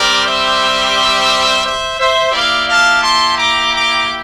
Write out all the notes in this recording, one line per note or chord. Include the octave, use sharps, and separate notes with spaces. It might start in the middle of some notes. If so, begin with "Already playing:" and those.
Already playing: G3 C4 G4 A#4 D5
C5 E5
C5 E5
C5 E5
A#3 E4 G4 D5 F5
F5 A5
A5 C6
A#5 D6
A#5 D6